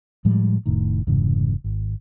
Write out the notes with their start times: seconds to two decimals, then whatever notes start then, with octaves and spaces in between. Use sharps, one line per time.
0.25 A2 F3 G3 G#3
0.66 F1 A2 D#3
1.07 F1 G#2 C#3 E3
1.64 G#1